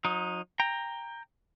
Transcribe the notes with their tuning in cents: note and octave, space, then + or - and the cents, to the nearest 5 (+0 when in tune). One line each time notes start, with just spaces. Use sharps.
F#3 -45 D#4 +0
G5 +20 A#5 +0